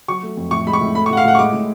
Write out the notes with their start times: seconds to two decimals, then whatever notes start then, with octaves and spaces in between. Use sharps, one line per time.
0.08 F#3 C#6
0.23 A3
0.37 F2
0.51 A2 C#6
0.67 G#3 B5
0.73 C#6
0.81 A2
0.95 A3 B5
1.06 C#6
1.10 A2 F#5
1.17 F5
1.24 A2 F#5
1.35 C#6
1.39 G#3 D6
1.53 A2